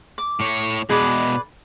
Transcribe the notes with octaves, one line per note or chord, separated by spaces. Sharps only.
D6
A2 C#5
B2 G#3 G#4 B4 D5